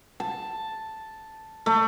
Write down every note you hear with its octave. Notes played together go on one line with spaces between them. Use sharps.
A5
A3